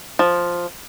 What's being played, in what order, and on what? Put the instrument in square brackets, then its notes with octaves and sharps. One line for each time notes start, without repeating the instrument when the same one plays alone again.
[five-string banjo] F3